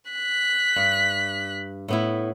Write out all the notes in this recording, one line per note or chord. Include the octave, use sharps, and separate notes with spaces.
F#6 B6
G2
A2 B3 E4